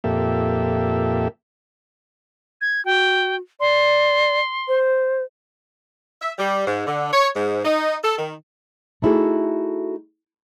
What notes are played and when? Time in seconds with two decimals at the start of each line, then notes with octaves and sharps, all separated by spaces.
0.04 F2 A#2 A#3 G4 A4 E5
2.61 G#6
2.85 F#4 G5
3.60 D5 C6
4.68 C5
6.21 E5
6.38 G3
6.67 G#2
6.87 D3
7.13 C#5
7.36 G#2
7.65 D#4
8.04 A4
8.18 D#3
9.02 A3 D#4 E4 F#4 G#4 A4